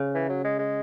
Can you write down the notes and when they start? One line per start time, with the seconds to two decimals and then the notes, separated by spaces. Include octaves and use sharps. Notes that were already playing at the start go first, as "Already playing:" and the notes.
Already playing: C#3
0.15 E3
0.29 F#3
0.44 G#3
0.59 G#3